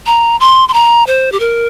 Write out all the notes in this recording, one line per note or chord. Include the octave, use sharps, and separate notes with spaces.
A#5
C6
C6
A#5
C5
G4
A#4